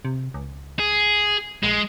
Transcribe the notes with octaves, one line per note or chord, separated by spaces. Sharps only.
C3
C#2
G#4
A#1 G#3